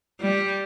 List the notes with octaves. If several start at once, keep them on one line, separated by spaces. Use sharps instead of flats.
G3